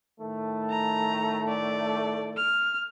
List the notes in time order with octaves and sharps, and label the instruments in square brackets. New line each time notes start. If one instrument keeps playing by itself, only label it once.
[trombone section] A2 D#3 A3
[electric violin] A#5
D5
F6